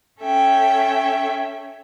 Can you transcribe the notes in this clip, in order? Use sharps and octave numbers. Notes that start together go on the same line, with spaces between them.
C#4 A4 E5 G5